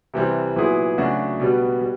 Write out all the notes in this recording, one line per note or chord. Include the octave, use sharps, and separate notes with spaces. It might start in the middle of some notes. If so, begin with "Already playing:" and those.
C3 E3 G3 C4
A#2 F#3 B3 E4 G#4
C#3 F#3 A3 D4 F#4
B2 G3 B3
G3